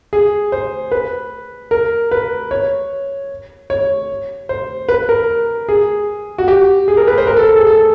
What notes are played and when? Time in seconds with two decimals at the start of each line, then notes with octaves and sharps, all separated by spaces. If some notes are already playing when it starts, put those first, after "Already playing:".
0.13 G#4
0.52 C5
0.91 B4
1.71 A#4
2.11 B4
2.51 C#5
3.70 C#5
4.49 C5
4.89 B4
5.09 A#4
5.69 G#4
6.38 F#4
6.48 G4
6.88 G#4
6.97 A#4
7.07 B4
7.18 C5
7.27 A#4
7.37 A4
7.47 A4
7.57 G#4
7.67 A4